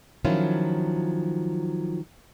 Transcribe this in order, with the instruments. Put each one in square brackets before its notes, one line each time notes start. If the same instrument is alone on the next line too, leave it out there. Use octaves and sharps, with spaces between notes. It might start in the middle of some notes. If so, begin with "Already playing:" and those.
[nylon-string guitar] D#3 F3 F#3 C#4 E4 F4